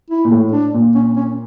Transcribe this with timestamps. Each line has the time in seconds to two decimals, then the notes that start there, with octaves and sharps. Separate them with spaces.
0.10 E4
0.25 A#2
0.31 A2
0.52 D4
0.74 A#2
0.95 C#4
1.16 C#4